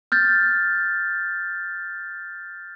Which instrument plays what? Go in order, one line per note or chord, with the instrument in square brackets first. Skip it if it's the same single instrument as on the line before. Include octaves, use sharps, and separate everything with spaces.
[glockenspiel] F6 G6 A6